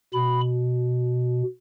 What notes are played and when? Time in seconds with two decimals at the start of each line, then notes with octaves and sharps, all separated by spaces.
0.13 B2 B5